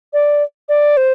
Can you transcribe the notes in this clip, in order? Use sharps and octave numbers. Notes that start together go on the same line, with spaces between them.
D5
D5
C5